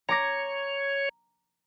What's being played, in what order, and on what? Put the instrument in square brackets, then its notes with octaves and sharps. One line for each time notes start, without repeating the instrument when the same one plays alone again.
[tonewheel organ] C#5 [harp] A#5 D6 A#6